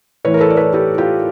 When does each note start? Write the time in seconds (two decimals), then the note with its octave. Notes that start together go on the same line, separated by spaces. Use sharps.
0.25 A2 E3 B4 C#5
0.34 A#4
0.41 A4 B4
0.50 D5
0.57 B4 C#5
0.74 G4 A4
0.98 F4 G4